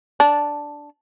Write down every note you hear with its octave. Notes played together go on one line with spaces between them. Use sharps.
D4